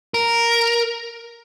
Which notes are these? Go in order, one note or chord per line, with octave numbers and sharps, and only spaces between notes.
A#4